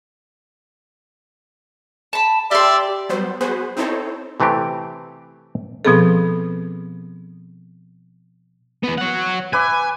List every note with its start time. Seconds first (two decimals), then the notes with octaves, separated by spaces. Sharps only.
2.13 A5 B5
2.51 G4 D5 E5 C6
3.09 F#3 G3 B3 C5
3.41 B3 F#4 G#4 B4 C5
3.77 C4 D#4 E4 A4 C5 C#5
4.40 C3 E3 A3 C4 G4
5.85 B2 F3 B3 C4 G#4 A4
8.84 E3 B3
8.98 C#5 F#5
9.53 B4 E5 G#5 D6